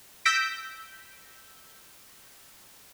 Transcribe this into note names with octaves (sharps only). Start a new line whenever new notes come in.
E6 G6 A#6 B6 D7